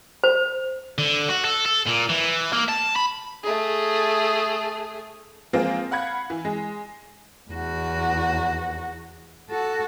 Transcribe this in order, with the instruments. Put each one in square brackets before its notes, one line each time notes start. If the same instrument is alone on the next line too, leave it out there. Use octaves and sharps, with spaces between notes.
[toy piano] C5
[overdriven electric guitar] D3
F#4
A4
A4
A#2
E3
A#3
A5
B5
[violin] A3 G#4
[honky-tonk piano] F3 G#3 A#3 C4 F4
F5 F#5 B5 G#6
E3
G#3
[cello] E2 F#4
F#4 A4